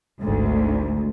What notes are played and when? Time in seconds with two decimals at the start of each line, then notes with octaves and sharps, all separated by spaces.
0.21 G#1 D2